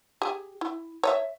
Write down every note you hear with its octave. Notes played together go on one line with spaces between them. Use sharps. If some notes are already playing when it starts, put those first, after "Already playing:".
G4 G#4
E4
C#5 D#5 E5